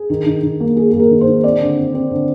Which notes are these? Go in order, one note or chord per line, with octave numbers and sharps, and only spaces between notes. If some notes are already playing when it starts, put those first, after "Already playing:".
Already playing: G#4
D#3
D#3
D#3
A#3
A#3 G#4
A#3 G#4
A#4
D#3
C5
D#3
C4 D5
D3
C4
C4
D3